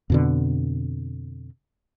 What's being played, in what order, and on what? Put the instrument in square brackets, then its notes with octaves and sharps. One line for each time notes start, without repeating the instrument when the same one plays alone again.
[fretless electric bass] F2 B2 D3